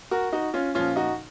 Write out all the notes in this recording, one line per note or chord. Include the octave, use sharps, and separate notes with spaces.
F#4 A#4
D#4 F#4
C#4 F4
A#2 F3 C#4 F4
D#4 F#4